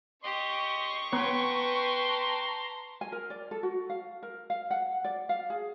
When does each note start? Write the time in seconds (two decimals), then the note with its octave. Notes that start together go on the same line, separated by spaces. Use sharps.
0.24 G4 D#5 C6 C#6
1.12 B3 B4 C#5 G5 A5 A#5 C6
3.01 G#5
3.12 A#4
3.30 D5
3.51 A4
3.63 F#4
3.90 F5
4.23 A#4
4.50 F5
4.71 F#5
5.04 D5
5.29 F5
5.50 G#4